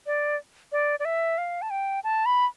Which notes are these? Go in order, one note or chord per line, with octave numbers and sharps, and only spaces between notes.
D5
D5
D5
E5
F5
A5
G5
A5
B5